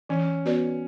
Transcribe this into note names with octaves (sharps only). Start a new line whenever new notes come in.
E3 C#4
B3 F#4 B4 D5